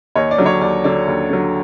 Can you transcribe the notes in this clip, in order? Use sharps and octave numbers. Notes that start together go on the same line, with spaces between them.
D#2 C#5 D#5
D5
D3 F#3
C#5
D#2 D5
D3 F#3 D5
D#2
D3 F#3